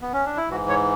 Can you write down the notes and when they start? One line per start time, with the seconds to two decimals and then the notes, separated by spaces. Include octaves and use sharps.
0.00 B3
0.13 C#4
0.26 D4
0.37 E4
0.50 G#2 E3 F#4
0.69 C#5